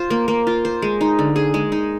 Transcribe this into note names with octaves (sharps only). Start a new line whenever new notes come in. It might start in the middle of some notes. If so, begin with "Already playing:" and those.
Already playing: F4 C5
A#3
A#3
F4
C5
G#3
D#4
D3
G#4
G#3
D#4